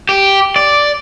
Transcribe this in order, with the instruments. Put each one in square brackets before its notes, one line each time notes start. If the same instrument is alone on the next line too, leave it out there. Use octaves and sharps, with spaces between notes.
[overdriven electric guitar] G4
D5